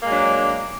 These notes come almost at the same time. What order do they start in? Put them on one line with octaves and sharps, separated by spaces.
A#3 G#3 F#3 D4